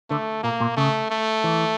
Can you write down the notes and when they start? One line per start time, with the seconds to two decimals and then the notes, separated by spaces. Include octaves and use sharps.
0.10 D3 A3
0.43 A#2 A#3
0.61 A#2
0.77 C#3 A3
1.10 A3
1.44 E3